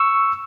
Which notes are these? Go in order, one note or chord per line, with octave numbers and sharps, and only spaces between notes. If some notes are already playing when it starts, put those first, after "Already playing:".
Already playing: C#6 E6